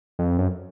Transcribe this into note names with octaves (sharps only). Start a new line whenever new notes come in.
F2
F#2